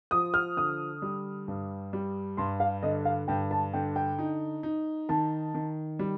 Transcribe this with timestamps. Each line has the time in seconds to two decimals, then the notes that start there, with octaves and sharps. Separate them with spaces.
0.11 F3 D#6
0.34 F6
0.57 D3 D#6
1.02 G3
1.48 G2
1.93 G3
2.37 G2 C6
2.60 F5
2.83 D3 D#5
3.05 F5
3.28 G2 G5
3.51 A5
3.73 D3 G5
3.96 G5
4.19 D#4
4.63 D#4
5.09 D#3 A5
5.54 D#3
5.99 G3